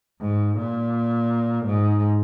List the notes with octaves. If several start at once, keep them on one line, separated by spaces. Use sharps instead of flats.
G#2
A#2
G#2